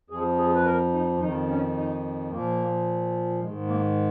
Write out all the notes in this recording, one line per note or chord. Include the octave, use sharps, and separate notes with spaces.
F2 F3 G#4
G#4
B4
A#4
D#4
F2 D#3 D#4
C#4
D#4
A#2 F3 A#3
G#2 D#3 G#3
A#3